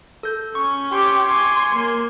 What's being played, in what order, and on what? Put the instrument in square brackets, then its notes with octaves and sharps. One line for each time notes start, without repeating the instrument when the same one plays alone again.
[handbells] A4 G6
[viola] C#4 [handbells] C#6
[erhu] G4 [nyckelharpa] C#5 [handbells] C6 D6
[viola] G#5 [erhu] C6 [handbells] D6
[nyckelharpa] A#3